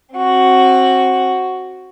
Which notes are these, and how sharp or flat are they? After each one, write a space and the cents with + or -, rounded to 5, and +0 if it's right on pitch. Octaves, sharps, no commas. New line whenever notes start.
C4 +25 F#4 +0